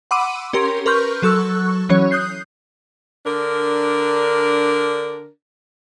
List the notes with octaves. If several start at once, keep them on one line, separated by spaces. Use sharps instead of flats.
F#5 B5 C6 D6 E6 D#7
C#4 G4 A#4 C6
A#4 B4 C6 C#6 F6 G6
F#3 A4 C#6 E6 F#6
E3 F#3 C#4 C#5
D#6 F#6 G6 C7
D3 D4 A#4